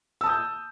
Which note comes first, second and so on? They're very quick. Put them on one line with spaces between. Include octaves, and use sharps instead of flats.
E6 A5 D#6 G6